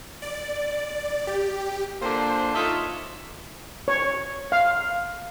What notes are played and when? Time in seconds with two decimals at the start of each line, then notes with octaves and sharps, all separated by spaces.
0.22 D5
1.27 G4
2.02 A#2 D3 D4 C5
2.55 D4 D#4 F4 A4 C#5 E5
3.88 C#5
4.52 F5